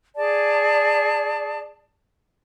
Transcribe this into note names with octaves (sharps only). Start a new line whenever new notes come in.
G#4 D5 A5